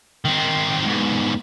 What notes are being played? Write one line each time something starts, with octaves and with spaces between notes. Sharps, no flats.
D#3 C4
G#2 B2